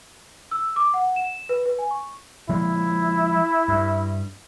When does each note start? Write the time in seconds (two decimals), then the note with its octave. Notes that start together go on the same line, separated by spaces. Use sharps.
0.51 E6
0.76 D6
0.94 F#5
1.16 E7
1.49 B4
1.66 B4
1.79 G#5
1.91 C#6
2.49 F3 G#3 A#3 E4
3.68 G2